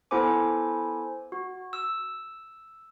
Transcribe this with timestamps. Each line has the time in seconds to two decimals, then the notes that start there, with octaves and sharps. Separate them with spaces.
0.11 B3 E4 A4 C5 G#5 D6
1.32 F#4
1.73 E6